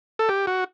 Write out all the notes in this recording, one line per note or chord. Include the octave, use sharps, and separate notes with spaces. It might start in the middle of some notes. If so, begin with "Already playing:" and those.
A4
G4
F#4